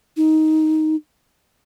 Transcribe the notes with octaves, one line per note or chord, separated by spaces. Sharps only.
D#4